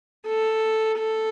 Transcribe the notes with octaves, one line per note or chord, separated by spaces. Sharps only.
A4
A4